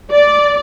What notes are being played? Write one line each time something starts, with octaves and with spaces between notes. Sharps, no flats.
D5